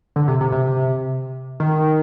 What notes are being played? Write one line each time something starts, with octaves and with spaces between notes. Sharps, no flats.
D3
C3
C3
C3
D#3